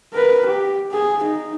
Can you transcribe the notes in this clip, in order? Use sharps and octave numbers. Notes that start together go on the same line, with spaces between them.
A#4 B4
G4
G#4
D#4